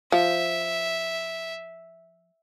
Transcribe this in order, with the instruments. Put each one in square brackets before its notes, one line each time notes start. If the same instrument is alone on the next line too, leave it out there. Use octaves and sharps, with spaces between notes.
[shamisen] F3 [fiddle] E5